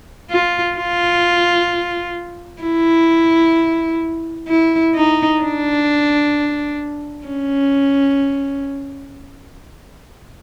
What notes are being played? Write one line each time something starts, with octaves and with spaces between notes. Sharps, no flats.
F4
F4
E4
E4
D#4
D4
C#4